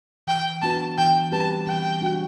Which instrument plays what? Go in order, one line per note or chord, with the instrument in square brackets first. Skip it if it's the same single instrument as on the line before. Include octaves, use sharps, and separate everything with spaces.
[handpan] E3 [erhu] G5
[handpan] B3 D4 F#4 B4 [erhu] A5
[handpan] E3 [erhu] G5
[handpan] G3 C4 G4 B4 [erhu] A5
[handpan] E3 [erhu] G5
[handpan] G3 D4 F#4